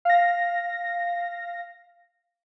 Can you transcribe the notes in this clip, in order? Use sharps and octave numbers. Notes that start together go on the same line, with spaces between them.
F5 A#6